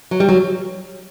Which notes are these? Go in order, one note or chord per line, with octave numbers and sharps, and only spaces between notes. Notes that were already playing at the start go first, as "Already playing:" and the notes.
F#3
G3
F#3